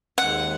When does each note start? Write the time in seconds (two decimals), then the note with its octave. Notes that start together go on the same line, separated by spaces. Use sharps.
0.18 D#2 D#3 G#3 F#5